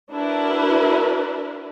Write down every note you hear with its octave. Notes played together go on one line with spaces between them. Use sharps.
D4 E4 F#4 A#4 B4